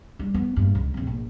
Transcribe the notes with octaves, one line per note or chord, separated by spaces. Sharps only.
G3 D4
B3
A#1 G2
C#2
G2 C4
A#1